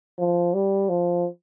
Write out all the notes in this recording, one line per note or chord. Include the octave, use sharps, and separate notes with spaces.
F3
G3
F3